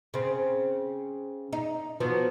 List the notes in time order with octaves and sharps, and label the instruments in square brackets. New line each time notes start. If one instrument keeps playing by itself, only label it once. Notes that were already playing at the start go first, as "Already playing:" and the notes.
[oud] C#3 C4
D#4
F3 F#3 B3